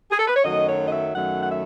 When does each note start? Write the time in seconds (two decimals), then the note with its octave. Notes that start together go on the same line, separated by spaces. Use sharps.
0.11 G#4
0.19 A4
0.28 B4
0.36 C#5
0.44 F#2 D#3 F#3 A3 D#5
0.67 C#5
0.86 D#5
0.92 E5
1.14 F#2 D#3 F#3 A3 F#5
1.41 F#5
1.50 E5